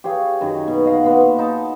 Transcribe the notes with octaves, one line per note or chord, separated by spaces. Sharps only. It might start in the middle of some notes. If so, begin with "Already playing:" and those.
G4 G#4 C#5 F5
F#2 D#3
B2
D#5 F5 F#5
A#2 B3 E5
D#4 A5